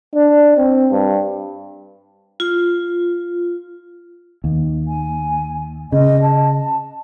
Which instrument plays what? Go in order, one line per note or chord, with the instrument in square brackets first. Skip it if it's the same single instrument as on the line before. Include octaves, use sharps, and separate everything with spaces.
[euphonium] D4
C4
G2
[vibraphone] F4
[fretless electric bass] D#2
[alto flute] G#5
[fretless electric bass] C#3 [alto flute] D#5
[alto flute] A5